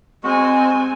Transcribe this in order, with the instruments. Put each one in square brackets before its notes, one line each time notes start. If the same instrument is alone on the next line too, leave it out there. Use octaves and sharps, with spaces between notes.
[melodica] G#3 F#4 [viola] C4 G#5